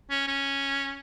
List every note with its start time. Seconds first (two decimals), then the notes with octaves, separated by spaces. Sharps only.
0.10 C#4
0.28 C#4